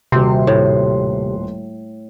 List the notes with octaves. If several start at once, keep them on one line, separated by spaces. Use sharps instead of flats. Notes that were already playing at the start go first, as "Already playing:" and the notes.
D#1 C3 F#4 C6
A2